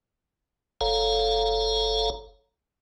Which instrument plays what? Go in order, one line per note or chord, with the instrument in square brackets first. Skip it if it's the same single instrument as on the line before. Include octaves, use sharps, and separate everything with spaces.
[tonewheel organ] F#1 A4 C#5 F5 A#5